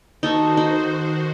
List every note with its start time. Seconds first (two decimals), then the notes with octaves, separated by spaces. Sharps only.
0.23 D#3 D#4 F#4 A4 C5 C#6
0.57 D#4